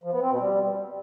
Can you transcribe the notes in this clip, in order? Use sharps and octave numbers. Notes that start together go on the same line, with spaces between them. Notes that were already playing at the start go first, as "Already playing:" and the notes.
F3
B3
C4
B2
G3